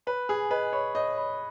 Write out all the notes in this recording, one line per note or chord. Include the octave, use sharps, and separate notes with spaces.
B4 B5
G#4 G#5
B4 D#5
C#5 B5
C#5 D#5
B5